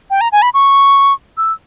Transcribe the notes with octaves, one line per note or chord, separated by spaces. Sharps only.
G5
A#5
G#5
B5
C#6
E6